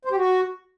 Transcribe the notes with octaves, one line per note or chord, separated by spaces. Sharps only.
C5
G4
F#4